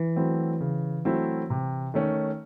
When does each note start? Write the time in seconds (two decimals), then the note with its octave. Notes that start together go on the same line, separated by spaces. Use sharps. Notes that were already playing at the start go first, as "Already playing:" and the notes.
Already playing: E3
0.16 F#3 A3 C4 E4
0.61 C#3
1.05 F#3 A3 C4 E4
1.50 C3
1.94 D#3 A3 C#4